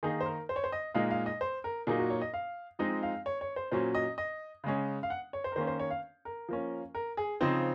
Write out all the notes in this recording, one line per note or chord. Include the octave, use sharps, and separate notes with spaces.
D#3 A#3 D#4 G#4
C5
A#4
C5
C#5
C5
D#5
A#2 G#3 D#4 F5
F5
D#5
C5
A#4
A#2 F#3 A#3 D#4 G#4
F#4
C#5
D#5
F5
F3 G#3 C4 D#4 D#5
F5
C#5
C#5
C5
A#2 F#3 C#4 C5
D#5
D#5
C#3 G#3 C#4
F5
F#5
C#5
C5
A#4
D#3 A#3 C#4 C5
C5
C#5
F5
A#4
F3 A#3 C#4
A#4
G#4
C#3 F3 C4 D#4 C5